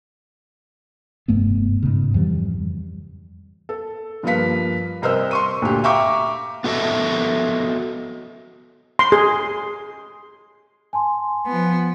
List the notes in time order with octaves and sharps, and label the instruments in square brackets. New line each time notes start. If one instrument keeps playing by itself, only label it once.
[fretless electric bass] F1 G2 A3 B3
G#2 C#3
F2 E3 G3
[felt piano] A4
G2 F3 A#3 B4 F5 B6
C2 A#4 C5 D#5 E6
C6 C#6 D#7
D2 A#2 G4
E5 F5 G5 A#5 C#6 D6
[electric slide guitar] B3 F#4 A4 C5 D#5 E5
[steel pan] C6
G#4
[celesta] G#5 A5 C6
[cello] F3 B3